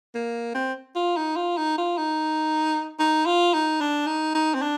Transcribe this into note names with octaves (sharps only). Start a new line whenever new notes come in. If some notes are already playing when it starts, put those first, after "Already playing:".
A#3
C4
F4
D#4
F4
D#4
F4
D#4
D#4
F4
D#4
D4
D#4
D#4
C4
D4